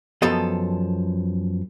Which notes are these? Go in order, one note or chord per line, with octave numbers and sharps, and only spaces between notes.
F#2 F3 B3 A4 D#5